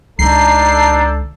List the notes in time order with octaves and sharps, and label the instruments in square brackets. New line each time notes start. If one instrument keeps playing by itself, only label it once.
[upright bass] C#2 D3 [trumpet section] D4 A4 [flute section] D#4 A#5 G6 [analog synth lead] C7